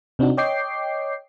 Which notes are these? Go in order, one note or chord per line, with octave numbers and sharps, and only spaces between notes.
C3 C4 D4 D#4 F#4
C#5 D#5 G5 D6 G6 C7